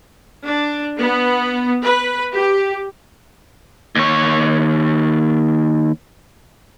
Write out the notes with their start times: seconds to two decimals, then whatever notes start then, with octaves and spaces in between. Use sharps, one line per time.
0.45 D4
0.99 B3
1.82 B4
2.33 G4
3.95 D#2 C#5